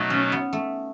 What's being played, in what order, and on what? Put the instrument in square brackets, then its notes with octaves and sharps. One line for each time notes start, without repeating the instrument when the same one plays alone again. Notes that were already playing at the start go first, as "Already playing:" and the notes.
Already playing: [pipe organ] B2 F#3 A3 [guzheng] B3 D#4
[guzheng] C#4
B3
A3